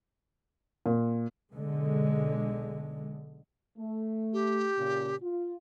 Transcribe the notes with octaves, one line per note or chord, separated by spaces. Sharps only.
A#2
B1 D3 G#3
A3
G4
A#2 C#3
F4